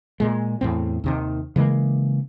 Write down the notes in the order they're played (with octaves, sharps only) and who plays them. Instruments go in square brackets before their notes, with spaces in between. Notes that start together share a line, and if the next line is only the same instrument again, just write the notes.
[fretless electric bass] A#2 G#3
E2 A2 C4
D#2 C3 D#3
C#3 E3 G#3 A#3